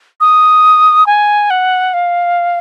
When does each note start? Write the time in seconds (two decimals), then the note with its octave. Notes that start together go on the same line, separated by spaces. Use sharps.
0.20 D#6
1.07 G#5
1.50 F#5
1.94 F5